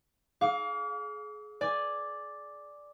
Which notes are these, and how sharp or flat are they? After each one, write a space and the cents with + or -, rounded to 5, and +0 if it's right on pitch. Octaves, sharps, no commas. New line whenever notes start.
G#4 +30 F5 +25 D6 -40
D5 +0 G#5 +0